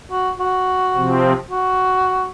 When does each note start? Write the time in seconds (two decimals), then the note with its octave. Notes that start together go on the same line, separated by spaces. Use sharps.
0.11 F#4
0.39 F#4
0.95 C3 F3 C4
1.50 F#4